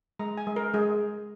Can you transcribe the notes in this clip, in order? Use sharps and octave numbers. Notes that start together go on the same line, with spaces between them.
G#3 A#5
G#5
G#3
A#4
G#3 G#4